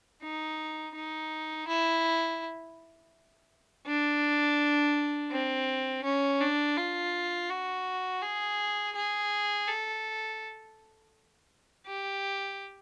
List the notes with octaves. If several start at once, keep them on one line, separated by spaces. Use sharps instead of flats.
D#4
D#4
E4
D4
C4
C#4
D4
F4
F#4
G#4
G#4
A4
G4